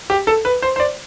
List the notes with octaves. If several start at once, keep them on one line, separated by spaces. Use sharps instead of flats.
G4
A4
B4
C5
C5
D5